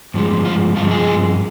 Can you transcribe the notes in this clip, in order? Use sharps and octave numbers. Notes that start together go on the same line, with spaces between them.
G2 F3 G#3
F4
G2 F3 G#3 F4
G#3 G#4